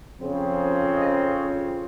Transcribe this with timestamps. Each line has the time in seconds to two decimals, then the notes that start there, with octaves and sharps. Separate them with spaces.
0.19 F2 C#3 F3 C4
0.95 D#5
1.34 C#5